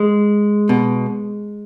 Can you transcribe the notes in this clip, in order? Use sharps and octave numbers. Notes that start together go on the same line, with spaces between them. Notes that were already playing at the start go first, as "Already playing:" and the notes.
Already playing: G#3
B2